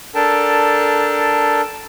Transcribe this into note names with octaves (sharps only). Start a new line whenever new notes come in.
D4 A4 A#4 G5 A5